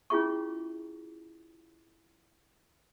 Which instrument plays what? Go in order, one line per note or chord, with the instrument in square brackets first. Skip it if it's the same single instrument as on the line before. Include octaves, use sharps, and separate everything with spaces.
[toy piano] C#4 E4 F4 G#4 E5 C#6